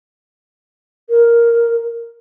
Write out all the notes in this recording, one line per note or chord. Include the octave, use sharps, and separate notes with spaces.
A#4